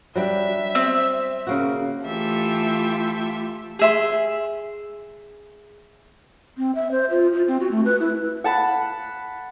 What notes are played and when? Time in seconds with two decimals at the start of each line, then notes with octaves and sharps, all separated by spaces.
0.16 F#3 G3 D4 E5
0.75 C4
1.47 C#3 A#3 F#4
2.06 E3 A3 F4 G4 A4 E5
3.79 G#4 E5 C6
6.58 C4
6.75 E5
6.91 C5
7.10 F4
7.32 F4
7.48 C4
7.60 F#4
7.71 A3
7.85 B4
8.00 E4
8.44 F#5 A5 B5